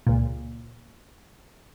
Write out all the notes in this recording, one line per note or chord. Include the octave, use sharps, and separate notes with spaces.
C#2 A#2